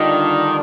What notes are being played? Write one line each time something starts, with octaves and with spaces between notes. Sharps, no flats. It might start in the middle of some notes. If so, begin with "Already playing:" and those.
Already playing: D3 D#3 G3 D4 F4